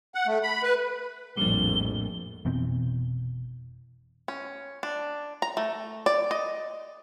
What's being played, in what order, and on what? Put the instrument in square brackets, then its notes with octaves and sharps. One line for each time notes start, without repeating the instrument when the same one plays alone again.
[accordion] F#5
A3
B5
B4
[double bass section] A#1 F2 A2 [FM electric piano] G3 A#3 D4 [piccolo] G7
[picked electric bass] F1 B2 E3 C4
[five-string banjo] C#4
D4
A#5
A3
D5
D#5